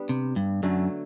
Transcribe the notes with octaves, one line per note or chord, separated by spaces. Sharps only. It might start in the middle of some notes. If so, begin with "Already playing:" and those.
Already playing: G3 B3 D4
C3
G2
F#2 D3 F#3 A3